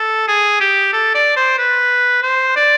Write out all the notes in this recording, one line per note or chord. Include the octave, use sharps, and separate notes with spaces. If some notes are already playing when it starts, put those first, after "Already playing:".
Already playing: A4
G#4
G4
A4
D5
C5
B4
C5
D5